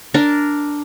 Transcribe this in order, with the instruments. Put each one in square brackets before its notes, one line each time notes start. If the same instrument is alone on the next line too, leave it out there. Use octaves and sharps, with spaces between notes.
[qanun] D4 A#4